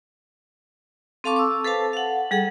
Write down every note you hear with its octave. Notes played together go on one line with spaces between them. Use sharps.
C4 A4 F5 A5 C#6 D6
D6 E6
A4 B4 C5 F5 A5
F5 F#5
G3 G#4 A4 F#5